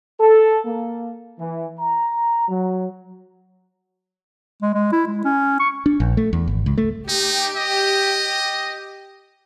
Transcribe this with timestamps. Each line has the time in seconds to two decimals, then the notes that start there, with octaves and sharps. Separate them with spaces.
0.21 A4
0.66 A#3
1.39 E3
1.80 A#5
2.49 F#3
4.62 G#3
4.74 G#3
4.93 E4
5.07 G#3
5.25 C#4
5.60 C#6
5.86 D4
6.00 A#1
6.17 A3
6.33 E2
6.47 G#1
6.66 C#2
6.78 A3
7.09 D#4 G4
7.57 D#5